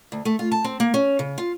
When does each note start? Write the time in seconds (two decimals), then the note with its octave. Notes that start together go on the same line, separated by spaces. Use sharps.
0.12 D2
0.25 A3
0.39 F4
0.52 A5
0.64 C4
0.80 A#3
0.94 C#4
1.19 C#3
1.38 F4